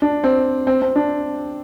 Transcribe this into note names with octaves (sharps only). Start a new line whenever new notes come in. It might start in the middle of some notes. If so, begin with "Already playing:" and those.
D4
C4
C4
C4
D4